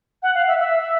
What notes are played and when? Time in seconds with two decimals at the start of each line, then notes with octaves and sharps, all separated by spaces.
0.23 F#5
0.35 F5
0.47 E5
0.59 E5